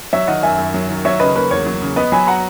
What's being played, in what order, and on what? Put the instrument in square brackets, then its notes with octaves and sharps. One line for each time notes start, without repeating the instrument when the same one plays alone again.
[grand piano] F#3 [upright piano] C#5 E5
[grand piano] D#3 [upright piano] D#5 F#5
[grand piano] F#2 [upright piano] E5 G#5
[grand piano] F#2
F#3
D#3
[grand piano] F#3 [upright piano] C#5 E5
[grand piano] C#3 [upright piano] B4 D#5
[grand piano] A#3 [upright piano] B4
[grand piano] E2 [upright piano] C#5
[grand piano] F#3
C#3
[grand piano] B3 [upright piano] B4 D#5
[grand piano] F#3 [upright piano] G#5 B5
[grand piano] F#4 [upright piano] F#5 A#5